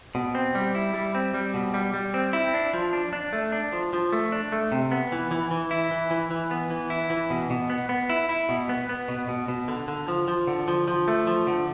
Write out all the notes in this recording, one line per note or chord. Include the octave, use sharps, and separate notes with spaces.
B2
C4
G3
E4
G3
C4
G3
B2
G3
G3
C4
E4
D4
F3
D4
D4
A3
D4
F3
F3
A3
D4
A3
C3
B3
E3
E3
E3
E4
E3
E3
E3
B3
E3
E4
E3
B2
B2
B3
B3
E4
E4
B2
B3
B3
B2
B2
B2
D3
D3
F3
F3
D3
F3
F3
A3
F3
D3